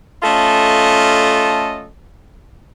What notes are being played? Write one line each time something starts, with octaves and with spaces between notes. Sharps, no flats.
A3 C#4 F4 A4 D#5